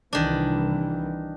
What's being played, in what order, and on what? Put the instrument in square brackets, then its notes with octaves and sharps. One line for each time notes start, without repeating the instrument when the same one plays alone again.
[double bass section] C2 E3 [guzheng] D#3 D4